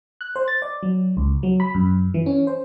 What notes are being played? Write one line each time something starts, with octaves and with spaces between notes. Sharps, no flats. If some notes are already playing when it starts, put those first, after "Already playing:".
F#6
C5
A6
D5
F#3
C#2
F#3
B5
F#2
E3
C#4
C5